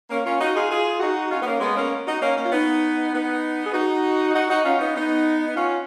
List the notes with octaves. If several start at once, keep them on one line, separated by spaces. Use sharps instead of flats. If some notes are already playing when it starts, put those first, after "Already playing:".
A#3 C#4
C#4 F4
D#4 F#4
F4 G#4
F4 G#4
D#4 F#4
C#4 F4
B3
A#3 C#4
G#3 B3
A#3 C#4
D#4 F#4
A#3 C#4
A#3 C#4
F4
B3 D#4
B3 D#4
G#4
D#4 F#4
D#4 F#4
D#4 F#4
C#4 F4
B3 D#4
B3 D#4
D#4
C#4 F4